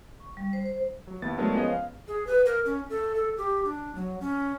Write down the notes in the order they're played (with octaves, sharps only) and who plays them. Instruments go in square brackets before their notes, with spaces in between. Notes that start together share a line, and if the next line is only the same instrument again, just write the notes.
[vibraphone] C#6
G3
C5
C5
[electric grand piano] F#3
D#2 B3 E4 A6
F#3 G#3 A3 B3 D4 A#4
F3 B3 C#4 G#4 C#5 D#5
F5
[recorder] G#4
B4
A#4
C#4
A4
A4
G4
D4
F#3
C#4